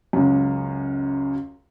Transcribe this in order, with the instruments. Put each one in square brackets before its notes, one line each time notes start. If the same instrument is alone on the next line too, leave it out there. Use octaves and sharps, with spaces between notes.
[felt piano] C#2 F#2